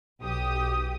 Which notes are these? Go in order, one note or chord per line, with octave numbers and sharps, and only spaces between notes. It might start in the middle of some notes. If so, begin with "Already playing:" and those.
B1 G4 D#6